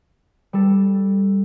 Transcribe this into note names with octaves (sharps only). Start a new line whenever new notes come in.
G3 A4